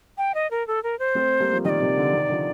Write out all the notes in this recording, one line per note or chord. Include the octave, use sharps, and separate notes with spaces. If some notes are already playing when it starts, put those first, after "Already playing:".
G5
D#5
A#4
A4
A#4
C5
A3 C4
G3 A#3
F3
D#3 G3 D5 D#5
C3 D#3
D3
C3 D#3
D3 F3